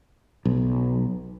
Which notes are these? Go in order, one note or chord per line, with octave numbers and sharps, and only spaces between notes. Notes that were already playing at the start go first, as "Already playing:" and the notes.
B1